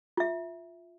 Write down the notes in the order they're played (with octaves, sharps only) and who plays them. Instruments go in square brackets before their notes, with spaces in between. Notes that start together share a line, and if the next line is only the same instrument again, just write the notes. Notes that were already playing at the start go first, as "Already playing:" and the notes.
[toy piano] F4 E5